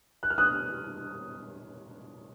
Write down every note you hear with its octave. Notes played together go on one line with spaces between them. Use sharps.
F#6
F6
D#6 F#6